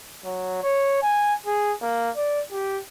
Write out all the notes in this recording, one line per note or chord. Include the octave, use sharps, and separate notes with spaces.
F#3
C#5
G#5
G#4
A#3
D5
G4